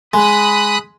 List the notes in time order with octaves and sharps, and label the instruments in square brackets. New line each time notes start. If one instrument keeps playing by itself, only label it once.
[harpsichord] G#3 [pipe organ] B5 D#6 F#6